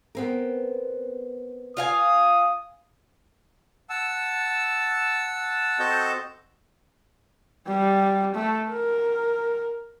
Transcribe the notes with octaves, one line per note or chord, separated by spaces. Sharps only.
B3 C4 A#4
F4 F5 G#5 D#6
F#5 A5 E6
C4 F#4 A4 D#5 A5 G6
G3
A3
A#4